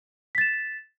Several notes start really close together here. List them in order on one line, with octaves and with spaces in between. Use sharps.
B6 A6 E7